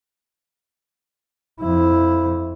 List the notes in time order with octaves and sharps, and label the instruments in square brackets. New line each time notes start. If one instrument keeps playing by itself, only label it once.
[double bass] F2 E4